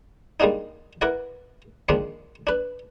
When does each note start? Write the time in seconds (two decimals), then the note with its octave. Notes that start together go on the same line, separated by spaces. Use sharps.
0.40 G3 G#3 A#3 D4 D#4
1.01 E4 A#4 B4 D5 F#5
1.89 D#3 F3 G#3 A#3 C4 D4
2.47 D4 B4